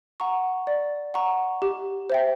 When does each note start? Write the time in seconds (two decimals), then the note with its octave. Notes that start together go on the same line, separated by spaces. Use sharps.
0.20 F#5 A#5 C#6
0.67 D5
1.14 F#5 A#5 C#6
1.62 G4
2.10 C5 E5 G5